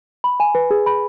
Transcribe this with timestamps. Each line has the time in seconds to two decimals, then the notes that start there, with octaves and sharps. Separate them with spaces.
0.24 B5
0.40 G#5
0.55 B4
0.71 G#4
0.86 B5